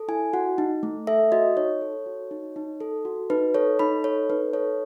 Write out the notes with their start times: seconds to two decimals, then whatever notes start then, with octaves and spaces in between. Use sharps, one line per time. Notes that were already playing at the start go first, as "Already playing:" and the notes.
Already playing: A4
0.08 E4 G#5
0.33 F#4 F#5
0.58 D#4
0.83 A3
1.07 A4 E5
1.32 F#4 D#5
1.57 D#4 C#5
1.81 A4
2.06 F#4
2.31 D#4
2.56 D#4
2.80 A4
3.05 F#4
3.30 D#4 B4
3.55 A4 C#5
3.79 D#4 B5
4.04 A4 C#5
4.30 D#4 B4
4.53 A4 C#5